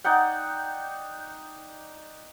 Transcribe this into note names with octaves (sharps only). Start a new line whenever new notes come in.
D#4 D5 F#5 G5